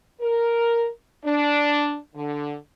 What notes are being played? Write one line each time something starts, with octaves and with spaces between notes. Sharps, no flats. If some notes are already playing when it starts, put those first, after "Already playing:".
A#4
D4
D3